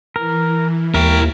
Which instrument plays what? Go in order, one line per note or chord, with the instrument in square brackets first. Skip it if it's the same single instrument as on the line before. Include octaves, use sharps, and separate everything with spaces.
[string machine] E3 [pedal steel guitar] A#4
[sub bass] D#2 [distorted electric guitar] E4 G5 [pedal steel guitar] A#4